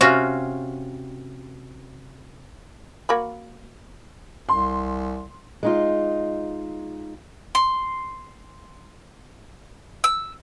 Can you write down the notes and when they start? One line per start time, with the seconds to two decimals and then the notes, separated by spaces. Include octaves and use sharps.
0.01 C3 C#4 F4 F#4
3.09 A#3 F#4 B5
4.49 C2 C6
5.63 G#3 D#4 F4
7.55 C6
10.04 E6